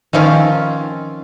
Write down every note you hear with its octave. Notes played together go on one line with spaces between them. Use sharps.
D#3 F3 C4 C#4 F4